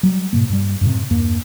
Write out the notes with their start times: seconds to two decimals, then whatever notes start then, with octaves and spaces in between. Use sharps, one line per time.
0.03 F#3 G3
0.33 G#2 B2 A#3
0.49 G2 G3
0.81 F#2 A2 C3
1.10 E2 G2 A#3